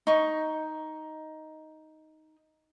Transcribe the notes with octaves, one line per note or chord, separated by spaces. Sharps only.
D#4 C#6